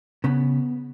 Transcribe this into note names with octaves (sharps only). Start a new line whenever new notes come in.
C#3 B3